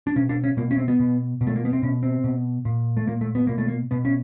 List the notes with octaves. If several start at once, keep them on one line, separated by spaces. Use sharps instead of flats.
D4
B2 C#4
D4
C#4
B2 A#3
C#4
C4
B3
B2
B2
A3
A#3
B3
C4
B2 C#4
C4
B2
A#2
A3
A#2 A#3
A3
B3
B2 A#3
A3
A#3
B2 B3
C#4